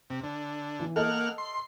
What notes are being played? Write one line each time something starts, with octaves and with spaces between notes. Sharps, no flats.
C3
D3
E3
A#3 A4 D#5 F#5 F6
C6